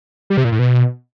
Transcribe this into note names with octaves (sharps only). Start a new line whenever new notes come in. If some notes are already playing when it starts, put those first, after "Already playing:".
G3
C3
A#2
A2
B2